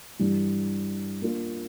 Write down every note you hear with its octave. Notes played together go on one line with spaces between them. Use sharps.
G2 E3 G3
A#3 D4 F4